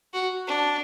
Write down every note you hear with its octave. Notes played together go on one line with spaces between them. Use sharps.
F#4
D4